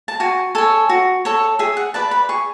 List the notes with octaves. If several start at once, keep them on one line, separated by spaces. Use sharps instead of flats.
A5
F#4 G#5
A4 C#5 G#5
F#4
A4 C#5
G#4 E5
F#5
B4 D5 A5
B5
G#4 C#6